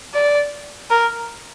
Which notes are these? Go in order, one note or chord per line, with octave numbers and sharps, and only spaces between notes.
D5
A#4